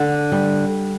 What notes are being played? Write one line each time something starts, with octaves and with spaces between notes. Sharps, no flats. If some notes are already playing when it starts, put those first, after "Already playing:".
Already playing: D3
G3